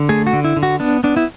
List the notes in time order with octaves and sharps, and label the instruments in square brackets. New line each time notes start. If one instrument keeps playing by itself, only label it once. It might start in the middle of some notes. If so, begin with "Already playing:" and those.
Already playing: [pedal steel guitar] D3
A3 G#4
F#4
D3
E4
D3
F#4
B3 D4
B3 D4
E4